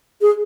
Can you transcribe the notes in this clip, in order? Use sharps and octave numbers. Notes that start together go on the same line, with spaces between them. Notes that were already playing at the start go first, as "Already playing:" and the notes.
G#4